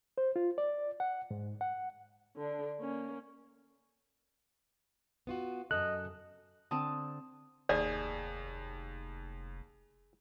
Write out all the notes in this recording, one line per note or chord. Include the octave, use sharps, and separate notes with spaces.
C5
F4
D5
F#5
G#2
F#5
D3 D4
A#3 C#4
B3 F4 F#4
F#2 A4 D#5 F#6
D3 C4 A5 D#6
F1 D#2 G#4 D5